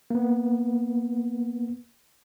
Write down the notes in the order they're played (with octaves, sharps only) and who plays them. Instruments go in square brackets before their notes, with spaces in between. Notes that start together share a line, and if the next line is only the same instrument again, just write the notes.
[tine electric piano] A#3 B3